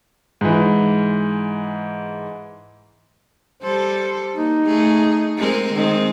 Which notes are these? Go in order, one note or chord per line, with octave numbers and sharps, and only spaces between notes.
G#2 E3
G3 A4 C5
A#3 D#4
A3 G#4
G#3 C4 A#4
D#3 G#3 C4